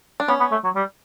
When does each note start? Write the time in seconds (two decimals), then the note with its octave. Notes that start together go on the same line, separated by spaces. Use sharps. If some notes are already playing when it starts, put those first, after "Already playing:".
0.20 D4
0.28 B3 C#4
0.40 B3
0.51 A3
0.64 F#3
0.75 G3